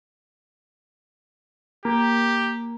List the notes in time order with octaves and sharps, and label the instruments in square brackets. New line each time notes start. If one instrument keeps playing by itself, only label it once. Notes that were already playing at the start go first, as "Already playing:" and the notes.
[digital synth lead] A#3 [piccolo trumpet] G4